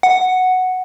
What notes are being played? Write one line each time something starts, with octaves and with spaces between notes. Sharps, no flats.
F#5